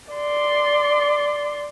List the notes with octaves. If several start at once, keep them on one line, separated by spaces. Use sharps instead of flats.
D5 C6